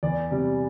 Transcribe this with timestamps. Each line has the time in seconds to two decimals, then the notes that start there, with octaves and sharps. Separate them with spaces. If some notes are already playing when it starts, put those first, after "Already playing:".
0.03 E2 D5
0.30 C3 G3